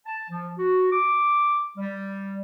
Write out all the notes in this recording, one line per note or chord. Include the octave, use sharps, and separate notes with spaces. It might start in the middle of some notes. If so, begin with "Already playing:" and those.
A5
F3
F#4
D6
G3